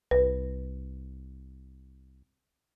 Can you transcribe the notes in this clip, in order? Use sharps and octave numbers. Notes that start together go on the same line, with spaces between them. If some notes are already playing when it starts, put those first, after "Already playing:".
C2 B4